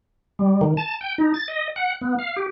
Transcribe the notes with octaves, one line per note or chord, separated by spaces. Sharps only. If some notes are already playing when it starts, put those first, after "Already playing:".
G3
D#3
A5
G5
D#4
A6
D#5
F#5
B3
F5
G4